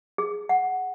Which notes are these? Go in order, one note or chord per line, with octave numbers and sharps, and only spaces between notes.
G#4
F#5